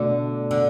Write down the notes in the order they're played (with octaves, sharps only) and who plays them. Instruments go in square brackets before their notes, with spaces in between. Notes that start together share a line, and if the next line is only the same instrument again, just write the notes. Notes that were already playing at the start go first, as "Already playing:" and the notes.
Already playing: [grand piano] B2 A3 D4 [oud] D3
[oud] D3